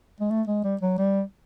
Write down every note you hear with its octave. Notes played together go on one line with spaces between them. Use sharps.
G#3
A3
G#3
G3
F#3
G3